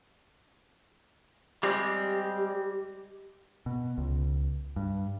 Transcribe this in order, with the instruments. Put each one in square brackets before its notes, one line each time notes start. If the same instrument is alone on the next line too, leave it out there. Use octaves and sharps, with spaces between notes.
[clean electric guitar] G3 G#3 C4 [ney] G4
[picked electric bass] B2
C#2
G2